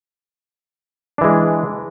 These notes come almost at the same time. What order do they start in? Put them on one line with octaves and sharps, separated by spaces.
D4 E3 G#3